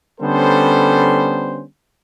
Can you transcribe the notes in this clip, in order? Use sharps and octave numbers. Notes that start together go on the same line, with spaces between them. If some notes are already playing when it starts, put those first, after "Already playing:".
D3 G3 B3 C#4 A4 C5